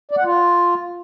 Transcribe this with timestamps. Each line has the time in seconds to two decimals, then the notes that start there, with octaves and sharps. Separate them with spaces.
0.11 D5
0.18 F#5
0.24 F4